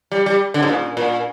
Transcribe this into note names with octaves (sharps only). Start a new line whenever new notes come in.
G3
G3
D3
G#2
A#2
A#2